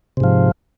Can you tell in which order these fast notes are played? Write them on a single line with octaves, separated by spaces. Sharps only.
C3 G#2 F3